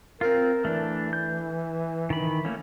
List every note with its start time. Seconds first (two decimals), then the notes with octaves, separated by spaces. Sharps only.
0.21 C4 F4 A#4
0.65 E3 A3 D4
1.13 G6
2.10 D#3 B5
2.45 A3 A#3 C#4